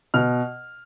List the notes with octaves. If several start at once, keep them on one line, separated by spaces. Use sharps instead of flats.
B2 F6